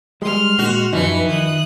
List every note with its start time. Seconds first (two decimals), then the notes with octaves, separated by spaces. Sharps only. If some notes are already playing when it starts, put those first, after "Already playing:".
0.22 G3 G#3 C6 F6
0.59 A#2 F#4
0.93 F#2 E3 F3 D#4 B4 C#7
1.27 D#3 D#6 F#6